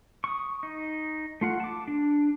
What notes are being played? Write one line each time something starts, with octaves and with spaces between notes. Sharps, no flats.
C#6 D#6
D#4
A3 F4 F#5
A5 D6
D4